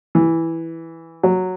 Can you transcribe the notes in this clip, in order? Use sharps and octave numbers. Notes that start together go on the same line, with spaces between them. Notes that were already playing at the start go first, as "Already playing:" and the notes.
E3
F#3